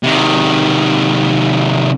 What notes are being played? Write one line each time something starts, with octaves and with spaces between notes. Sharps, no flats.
C3 D#3